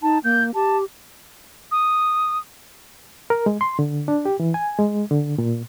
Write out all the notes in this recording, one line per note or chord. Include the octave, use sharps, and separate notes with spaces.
D#4 A5
A#3 G6
G4 A5
D#6
A#4
G#3
C6
D3
D4
G4
E3
G#5
G#3
D3
A#2